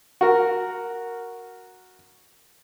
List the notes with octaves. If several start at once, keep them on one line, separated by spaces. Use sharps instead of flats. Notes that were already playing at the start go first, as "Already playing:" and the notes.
F#4 A#4